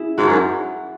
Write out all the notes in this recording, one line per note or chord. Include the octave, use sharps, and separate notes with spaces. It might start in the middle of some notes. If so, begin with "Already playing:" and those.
Already playing: C#4 E4 G#4
G#2 F#4
F#2